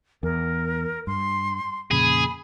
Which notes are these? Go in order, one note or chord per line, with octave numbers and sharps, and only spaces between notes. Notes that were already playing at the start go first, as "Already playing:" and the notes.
E2 A#4
G2 C6
F2 A#2 C#3 G#4 B5